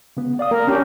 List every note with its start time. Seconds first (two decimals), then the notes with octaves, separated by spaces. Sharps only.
0.17 C#3 B3
0.39 D5 F5 D#6
0.51 A#3 A#4
0.67 C#4 D4 G4